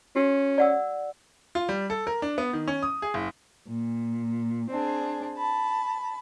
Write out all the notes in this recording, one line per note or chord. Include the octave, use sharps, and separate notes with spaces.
C#4 F#4
D5 F#5 E6
F4
G3
A4
A#4
D4
B3
D#3
C#4
D#6
G#4
F#1
A#2
C4 D4 G#4
A5 B5